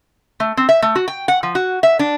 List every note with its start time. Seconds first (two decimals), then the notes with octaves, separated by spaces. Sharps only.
0.40 A3
0.57 C4
0.69 E5
0.82 A3
0.96 F#4
1.08 G5
1.28 F#5
1.43 F3
1.55 F#4
1.83 E5
1.99 D4